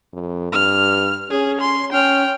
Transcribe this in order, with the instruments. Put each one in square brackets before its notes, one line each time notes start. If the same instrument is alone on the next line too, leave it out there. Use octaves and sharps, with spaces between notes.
[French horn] F2
[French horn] G2 [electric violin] F6
[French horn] C#4 [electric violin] G#4
[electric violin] C6
[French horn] C#4 [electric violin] G5 F6